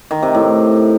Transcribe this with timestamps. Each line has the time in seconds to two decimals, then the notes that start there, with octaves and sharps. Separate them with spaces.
0.11 D#3
0.23 C3
0.35 A2